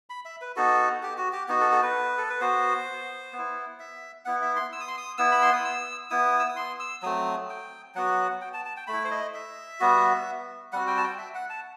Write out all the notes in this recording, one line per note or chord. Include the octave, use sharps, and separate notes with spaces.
B5
E5
B4
B3 D#4 F#4 A4
G4
F#4
G4
B3 D#4 F#4
A4
A4
B4
A4
B4
B3 F#4 C5
B3
E4
E5
B3 E4 F#5
E5
C6
E6
D#6
C6
D#6
B3 E4 E6
B5
C6
D#6
E6
B3 E4 D#6
E6
D#6
C6
E6
F#3 A3 C4 D#6
G5
F#3 B3 F#4 F#5
G5
A5
A5
G5
A3 B5
E4
C5
D#5
E5
G3 B3 F#4
G3 C4 F#4 F#5
G5
A5
G5
E5
F#5
A5